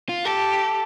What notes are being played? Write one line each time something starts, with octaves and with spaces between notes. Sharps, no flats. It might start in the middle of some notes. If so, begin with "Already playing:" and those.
F4
G4 A4